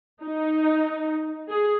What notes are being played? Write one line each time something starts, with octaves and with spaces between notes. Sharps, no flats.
D#4
G#4